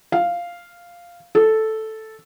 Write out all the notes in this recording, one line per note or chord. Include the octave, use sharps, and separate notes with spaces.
F5
A4